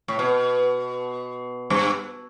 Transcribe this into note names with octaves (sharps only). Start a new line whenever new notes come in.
A2
B2
G2